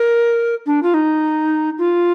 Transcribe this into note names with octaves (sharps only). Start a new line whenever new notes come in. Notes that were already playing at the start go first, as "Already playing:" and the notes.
Already playing: A#4
D4
F4
D#4
F4